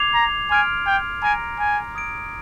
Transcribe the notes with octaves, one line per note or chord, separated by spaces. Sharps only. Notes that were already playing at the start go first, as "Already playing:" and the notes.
Already playing: D6 G#6 C7 F7
A#5
G#5 C6 F6 G#6 D7
G5
G#5 A#5 F6 A#6 D7
G#5
D#6 G#6 D7